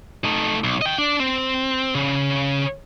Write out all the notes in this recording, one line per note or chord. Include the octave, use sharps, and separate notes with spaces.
A3 D#4
B1
D#5 G5
D4
C4
C#3